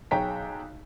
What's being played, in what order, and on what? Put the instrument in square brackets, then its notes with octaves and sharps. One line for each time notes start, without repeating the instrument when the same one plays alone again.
[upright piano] B1 G#4 C#5 G5 A#5 B6